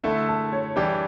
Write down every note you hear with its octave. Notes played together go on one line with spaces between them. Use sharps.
D3 A3 E4 A4 A5
A5
C#5
E3 G3 D4 G4 D5